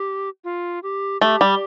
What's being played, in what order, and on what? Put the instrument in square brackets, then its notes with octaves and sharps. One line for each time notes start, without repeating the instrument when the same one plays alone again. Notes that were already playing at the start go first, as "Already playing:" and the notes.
Already playing: [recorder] G4
F4
G4
[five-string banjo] A3 [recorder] G4
[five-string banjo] G3